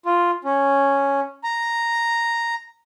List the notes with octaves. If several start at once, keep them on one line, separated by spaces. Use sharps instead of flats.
F4
C#4
A#5